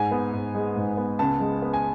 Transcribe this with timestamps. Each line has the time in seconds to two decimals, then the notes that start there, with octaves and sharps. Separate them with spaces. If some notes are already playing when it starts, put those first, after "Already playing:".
Already playing: G#2 G#5
0.11 B3
0.33 G#2
0.55 G#3
0.76 G#2
0.97 B3
1.19 C#2 A5
1.40 G#3
1.62 B3
1.73 G#5